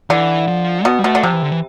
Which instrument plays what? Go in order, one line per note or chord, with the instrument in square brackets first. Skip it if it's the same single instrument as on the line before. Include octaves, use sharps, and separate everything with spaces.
[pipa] D3 [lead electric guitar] E3
[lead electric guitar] F3
[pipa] B2 [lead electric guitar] B3
[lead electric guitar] G3
[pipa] B2 [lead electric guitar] A3
[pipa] D3
[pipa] C3 [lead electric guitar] F3
[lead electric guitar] E3
D3
E3